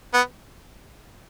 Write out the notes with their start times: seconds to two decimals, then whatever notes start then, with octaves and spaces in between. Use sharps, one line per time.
0.14 B3